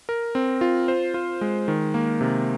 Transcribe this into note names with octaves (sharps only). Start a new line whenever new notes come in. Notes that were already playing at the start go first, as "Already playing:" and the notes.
A#4
C4
F4
C5
F4
G#3
D#3
A#3
C3